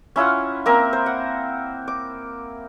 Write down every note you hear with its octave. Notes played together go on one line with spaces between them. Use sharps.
C#4 E4 F4 F#5
A#3 C4 A#4 E5
C5
F#5
D6